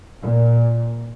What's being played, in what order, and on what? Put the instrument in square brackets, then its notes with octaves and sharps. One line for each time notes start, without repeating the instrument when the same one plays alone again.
[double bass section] A#2